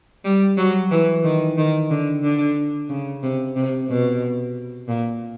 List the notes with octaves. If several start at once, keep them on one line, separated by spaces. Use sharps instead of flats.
G3
F#3
E3
D#3
D#3
D3
D3
C#3
C3
C3
B2
A#2